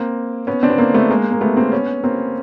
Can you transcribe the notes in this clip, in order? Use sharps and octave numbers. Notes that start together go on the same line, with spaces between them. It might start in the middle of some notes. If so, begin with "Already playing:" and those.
Already playing: A#3 C4
B3 C#4
C4 D4
B3
A#3 C4
A3 B3
G#3 A#3
A#3
A3 B3
A#3 C4
B3 C#4
A#3 C4